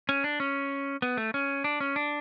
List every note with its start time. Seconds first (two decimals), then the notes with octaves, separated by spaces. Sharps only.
0.09 C#4
0.24 D4
0.40 C#4
1.02 B3
1.17 A3
1.34 C#4
1.64 D4
1.80 C#4
1.96 D4